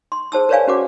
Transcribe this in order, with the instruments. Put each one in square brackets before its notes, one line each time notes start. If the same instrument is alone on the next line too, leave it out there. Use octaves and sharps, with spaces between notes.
[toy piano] C6
G#4 C5 A5 E6
A#4 B4 C#5 D5 F5 G#5
C#4 F#4 B4 F#5 D6